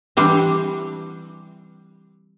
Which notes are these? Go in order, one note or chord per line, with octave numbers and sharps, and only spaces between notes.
E3 G3 C4 D4